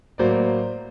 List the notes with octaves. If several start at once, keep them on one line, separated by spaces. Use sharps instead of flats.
A2 F#3 A#3 C5 D5